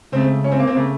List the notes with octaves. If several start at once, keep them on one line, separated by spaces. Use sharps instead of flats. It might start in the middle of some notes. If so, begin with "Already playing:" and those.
C#2 C#3 A3 C4
C#4
C4
A#3
C4
C#3 A3 A#3